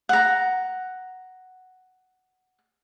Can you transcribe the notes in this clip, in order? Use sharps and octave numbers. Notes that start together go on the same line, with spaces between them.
F#5 A#5